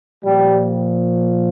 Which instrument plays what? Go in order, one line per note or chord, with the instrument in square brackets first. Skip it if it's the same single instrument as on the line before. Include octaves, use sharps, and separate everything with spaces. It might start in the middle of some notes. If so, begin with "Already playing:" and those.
[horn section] A#2 F3 G3